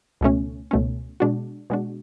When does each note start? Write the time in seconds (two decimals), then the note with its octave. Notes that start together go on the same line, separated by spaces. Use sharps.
0.21 C#2 B2 A3 C#4
0.71 C#2 B2 A3 C#4
1.20 B2 G#3 D4 F#4
1.70 B2 G#3 D4 F#4